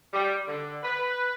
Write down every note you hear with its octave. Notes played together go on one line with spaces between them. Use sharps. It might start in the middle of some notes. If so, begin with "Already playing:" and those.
G3
D3
B4